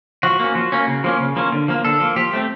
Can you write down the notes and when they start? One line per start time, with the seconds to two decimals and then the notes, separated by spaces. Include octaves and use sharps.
0.23 F3 F#4
0.40 A#3 C#4
0.55 F3
0.72 A#3 C#4
0.87 C#3
1.04 F3 A#3 C#4
1.20 C#3
1.36 F3 A#3 C#4
1.52 D3
1.68 F3 A#3
1.85 D3 A4
2.00 F3 A#3
2.16 F3 G4
2.33 A3 C4